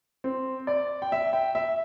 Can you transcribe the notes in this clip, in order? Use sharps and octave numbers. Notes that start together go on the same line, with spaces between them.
C4
D5
G5
E5
G5
E5